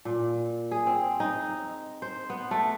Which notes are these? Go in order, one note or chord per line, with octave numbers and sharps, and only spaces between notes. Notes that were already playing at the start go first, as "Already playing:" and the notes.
A#2
G#4
C4
D#4
C5
B3
A3